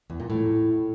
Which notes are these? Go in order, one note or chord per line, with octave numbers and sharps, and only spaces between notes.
E2
A#2
A2